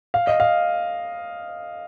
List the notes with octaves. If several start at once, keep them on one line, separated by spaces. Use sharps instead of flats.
F5
D#5
F5